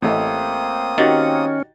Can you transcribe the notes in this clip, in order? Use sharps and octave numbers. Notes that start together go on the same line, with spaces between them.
A1 A3 A#3 C4 D#5 D#6
D#3 C#4 F#4 G4 A6